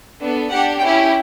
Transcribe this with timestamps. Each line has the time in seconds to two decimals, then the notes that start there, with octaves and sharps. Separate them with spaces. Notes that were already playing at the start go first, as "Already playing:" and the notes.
0.20 B3 D4 A4
0.49 D4 G4 F#5
0.80 C#4 E4 G4 G5